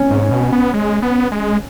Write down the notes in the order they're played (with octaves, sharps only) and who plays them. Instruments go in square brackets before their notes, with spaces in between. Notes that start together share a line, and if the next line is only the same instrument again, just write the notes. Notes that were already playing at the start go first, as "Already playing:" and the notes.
Already playing: [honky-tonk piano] C#4
[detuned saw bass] G#2
B2
B3
G#3
B3
G#3